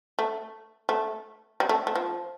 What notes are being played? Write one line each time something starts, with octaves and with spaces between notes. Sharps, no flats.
A3
A3
G3
A3
A3
F3